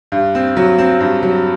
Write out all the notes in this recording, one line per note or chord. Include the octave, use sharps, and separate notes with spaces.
G2
C4
F#3
C4
G2
F#3